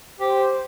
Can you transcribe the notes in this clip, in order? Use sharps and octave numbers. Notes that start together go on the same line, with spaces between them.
G4 C5